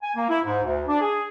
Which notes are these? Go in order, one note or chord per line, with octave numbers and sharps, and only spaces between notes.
G#5
A#3
E4
G#2
D2
D4
G#4